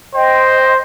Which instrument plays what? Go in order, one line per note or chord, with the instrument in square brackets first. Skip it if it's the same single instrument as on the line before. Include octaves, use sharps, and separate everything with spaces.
[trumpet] C5 [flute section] D#5 G5